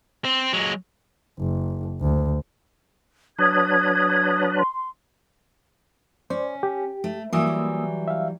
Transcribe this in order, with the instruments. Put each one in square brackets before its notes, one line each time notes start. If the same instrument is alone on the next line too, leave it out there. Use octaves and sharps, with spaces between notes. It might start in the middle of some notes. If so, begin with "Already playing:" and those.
[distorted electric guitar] C4
F#3 G#3
[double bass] F#1
D2
[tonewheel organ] F#3 D4 B4 [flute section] D#6 G#6
[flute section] C6
[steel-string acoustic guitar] C#4 [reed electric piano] C5 D5
[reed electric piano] G4
[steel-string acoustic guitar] A3
[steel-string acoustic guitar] E3 F#3 G3 [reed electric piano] A#3 D#6 E6
[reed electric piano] E5 F5